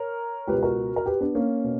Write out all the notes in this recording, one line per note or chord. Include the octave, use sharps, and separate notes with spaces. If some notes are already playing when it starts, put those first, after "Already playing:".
Already playing: A#4 C#5
C#2 B2 G4 B4
F#4 A#4
A#4
G4 B4
B3 D4
A#3 C#4
B2